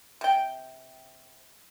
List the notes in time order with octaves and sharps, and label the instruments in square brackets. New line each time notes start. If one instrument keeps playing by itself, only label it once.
[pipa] C3 G5